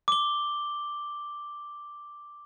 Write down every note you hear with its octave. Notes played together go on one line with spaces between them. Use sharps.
D6 G7